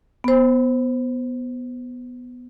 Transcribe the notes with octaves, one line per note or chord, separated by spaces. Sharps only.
B3 C5